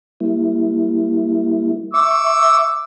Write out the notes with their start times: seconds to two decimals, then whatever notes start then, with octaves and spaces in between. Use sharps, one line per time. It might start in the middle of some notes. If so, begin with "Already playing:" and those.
0.20 G3 A#3 E4
1.94 E5 C#6 D6 E6